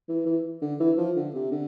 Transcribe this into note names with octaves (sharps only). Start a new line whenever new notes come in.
E3
E3
D3
E3
F3
D3
C3
D3